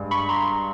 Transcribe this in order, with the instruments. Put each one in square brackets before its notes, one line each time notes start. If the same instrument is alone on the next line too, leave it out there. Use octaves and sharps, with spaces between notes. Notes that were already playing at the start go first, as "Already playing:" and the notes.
Already playing: [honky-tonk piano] G2 G#3
[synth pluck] B5 C#6
A#5 C6